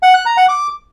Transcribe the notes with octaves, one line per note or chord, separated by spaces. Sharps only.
F#5
F#6
A#5
F#5
D6